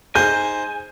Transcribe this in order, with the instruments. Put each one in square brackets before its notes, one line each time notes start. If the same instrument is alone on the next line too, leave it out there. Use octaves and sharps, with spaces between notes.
[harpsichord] D#4 C5 [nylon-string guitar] G#4 [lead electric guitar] G#5 [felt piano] G6